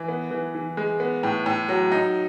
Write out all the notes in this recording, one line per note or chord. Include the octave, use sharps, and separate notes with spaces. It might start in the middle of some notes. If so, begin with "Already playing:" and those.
Already playing: E3
B3
E3
E3
G#3
B3
A2
A2
F#3
D#4